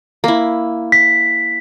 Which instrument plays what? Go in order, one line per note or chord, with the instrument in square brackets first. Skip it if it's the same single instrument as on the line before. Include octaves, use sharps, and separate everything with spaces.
[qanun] A#3 E4
[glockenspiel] B6